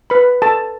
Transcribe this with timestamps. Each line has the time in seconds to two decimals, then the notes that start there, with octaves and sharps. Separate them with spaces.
0.10 B4 B5
0.42 A4 A5